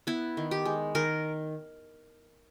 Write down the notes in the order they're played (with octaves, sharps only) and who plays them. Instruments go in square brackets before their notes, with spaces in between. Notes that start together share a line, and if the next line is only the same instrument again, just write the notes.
[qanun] B3 E4
D#3
G4
G#3
D#3 A#4